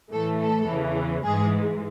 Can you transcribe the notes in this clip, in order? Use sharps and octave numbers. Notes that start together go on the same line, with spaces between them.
A2 E3 A3 A4
A4
E2 C#3 E3
G#2 E3 G#3 G#4